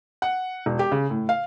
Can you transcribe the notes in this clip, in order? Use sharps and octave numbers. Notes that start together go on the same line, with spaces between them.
F#5
E1
G4
C#3
A2
F5